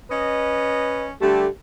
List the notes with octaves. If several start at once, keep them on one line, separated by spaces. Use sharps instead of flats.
C#4 B4 D#5
D3 G3 A3 G4